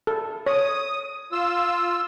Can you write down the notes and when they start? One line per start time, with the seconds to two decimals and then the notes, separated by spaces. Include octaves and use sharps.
0.07 A4
0.46 C#5 D#6
1.32 F4 E6